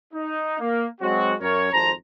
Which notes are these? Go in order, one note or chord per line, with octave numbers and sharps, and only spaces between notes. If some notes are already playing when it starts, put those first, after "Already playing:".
D#4
A#3
F#3 G#3 C4 F#4
F#2 A#4 C#5
G#1 F2 C5 A5 A#5